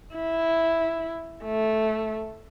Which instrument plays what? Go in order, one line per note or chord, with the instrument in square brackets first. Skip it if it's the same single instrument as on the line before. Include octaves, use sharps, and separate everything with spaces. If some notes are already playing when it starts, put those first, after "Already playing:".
[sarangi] E4
A3